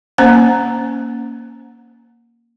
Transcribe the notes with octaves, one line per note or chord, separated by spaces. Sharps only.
A#3 C#4 C5 A#5